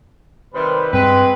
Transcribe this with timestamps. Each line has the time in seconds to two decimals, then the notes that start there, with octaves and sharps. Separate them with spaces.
0.54 C3 D#3 G3 B4 C5
0.93 G2 G#3 C4 B4